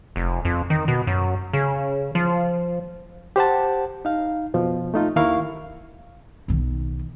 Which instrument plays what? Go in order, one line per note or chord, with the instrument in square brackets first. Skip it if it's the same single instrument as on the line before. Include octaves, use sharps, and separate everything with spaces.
[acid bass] F1
F2
D#3
B2
F#2
C#3
F3
[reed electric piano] G4 C5 F#5 A5
D#4 F5
F2 B2 F3
A3 D#4 F4
D#2 D#3 E4 A#4 F5 C#6
[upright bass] B1 D#3